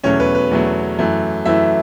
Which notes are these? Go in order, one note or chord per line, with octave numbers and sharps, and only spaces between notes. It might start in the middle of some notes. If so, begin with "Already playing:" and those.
E2 B2 F#3 A3 C#4 C#5
B4
B4
E2 B2 F#3 A3
F#2 E3 A3
F#2 E3 A3 E4 E5